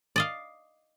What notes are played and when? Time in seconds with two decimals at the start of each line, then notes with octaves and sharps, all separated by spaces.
0.16 D5 D#5 F5